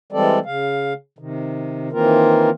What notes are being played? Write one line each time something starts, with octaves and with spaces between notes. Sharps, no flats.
E3 G3 G#3 C4 A4 D5
C#3 F5
C3 D#3
D#3 E3 A#3 C4 F4 A#4